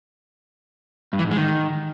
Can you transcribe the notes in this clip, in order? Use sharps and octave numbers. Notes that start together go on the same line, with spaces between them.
G2
E3
G#2
G#3
D#3